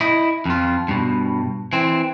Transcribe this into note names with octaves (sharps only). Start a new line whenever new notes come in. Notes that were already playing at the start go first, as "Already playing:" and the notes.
E4 D#5
F2 F4
G2 B2
E3 C4